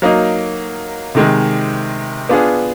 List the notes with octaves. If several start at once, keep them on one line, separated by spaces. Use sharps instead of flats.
F#3 A#3 D#4
C3 D#3 G#3
B3 D4 F4 G#4